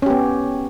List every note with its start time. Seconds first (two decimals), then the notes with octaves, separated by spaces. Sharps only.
0.02 C#4
0.06 G4
0.10 B3